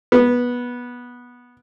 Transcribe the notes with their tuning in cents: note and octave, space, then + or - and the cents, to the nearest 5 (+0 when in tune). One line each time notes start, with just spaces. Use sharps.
B3 -15